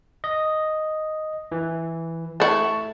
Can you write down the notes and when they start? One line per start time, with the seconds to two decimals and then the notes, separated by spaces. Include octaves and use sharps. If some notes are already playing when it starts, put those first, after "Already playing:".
0.24 D#5
1.52 E3
2.40 A3 E4 A5 C#6